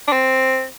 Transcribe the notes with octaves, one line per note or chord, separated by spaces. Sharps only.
D4
C4